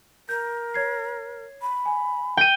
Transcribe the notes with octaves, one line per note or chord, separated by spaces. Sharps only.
A#4 G6
C#5 G#6 C7
B5
G#5
G5 D#7